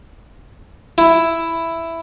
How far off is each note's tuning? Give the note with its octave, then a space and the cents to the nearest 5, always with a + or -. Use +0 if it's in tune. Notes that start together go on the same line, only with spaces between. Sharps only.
E4 +5